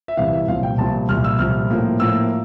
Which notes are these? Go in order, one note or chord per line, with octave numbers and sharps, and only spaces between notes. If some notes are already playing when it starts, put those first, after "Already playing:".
E5
C2 C3 E3 F5
E5
C2 A#2 F3 F5
G5
C2 A#2 F3 A5
C2 A#2 F3 F6
E6
C2 A#2 F3 F6
A2 F3 A#3
A2 F3 A#3 E6